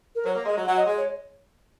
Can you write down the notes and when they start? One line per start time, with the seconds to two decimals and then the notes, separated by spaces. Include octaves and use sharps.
0.15 A#4
0.25 F#3 C#5
0.36 A#3
0.46 G#3 D#5
0.55 F#3
0.66 F#3 F#5
0.76 D#5
0.87 G#3
0.97 C#5